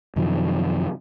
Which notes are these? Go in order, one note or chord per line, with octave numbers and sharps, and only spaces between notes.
F#2 C3 D#3 F3